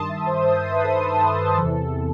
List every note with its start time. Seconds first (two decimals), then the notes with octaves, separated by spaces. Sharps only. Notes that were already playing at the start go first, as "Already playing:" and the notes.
Already playing: G2 D#3 A5 C6 D#6
0.09 E5
0.26 C5
0.43 C5
0.59 C5
0.72 B4
0.83 A4
0.96 A4
1.58 E2 C3 E3